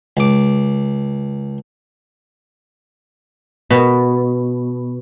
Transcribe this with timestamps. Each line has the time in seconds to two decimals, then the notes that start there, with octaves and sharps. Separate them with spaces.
0.17 C#2 D6
3.70 B2